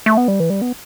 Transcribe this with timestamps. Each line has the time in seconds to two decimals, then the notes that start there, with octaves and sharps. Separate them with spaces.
0.06 A3
0.17 B3
0.28 G3
0.40 E3
0.50 G3
0.62 B3